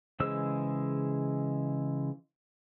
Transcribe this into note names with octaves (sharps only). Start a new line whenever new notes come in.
C#3 E3 G#3 C5 E6